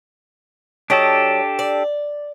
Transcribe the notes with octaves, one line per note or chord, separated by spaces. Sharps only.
F#3 D4 G4 A4 D#5
D5